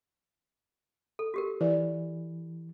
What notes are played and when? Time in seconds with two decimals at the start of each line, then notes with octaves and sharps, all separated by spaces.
1.19 A4
1.34 F#4 G4 A#4
1.61 E3 D5